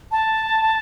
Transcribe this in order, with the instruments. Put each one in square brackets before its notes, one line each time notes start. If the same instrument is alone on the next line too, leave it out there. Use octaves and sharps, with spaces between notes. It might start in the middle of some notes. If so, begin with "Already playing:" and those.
[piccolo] A5